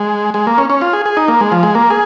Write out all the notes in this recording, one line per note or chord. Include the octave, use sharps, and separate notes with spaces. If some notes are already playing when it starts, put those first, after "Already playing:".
Already playing: G#3
G#3
A#3
C#4
C#4
F4
G#4
G#4
D#4
A#3
G#3
F3
G#3
A#3
G#4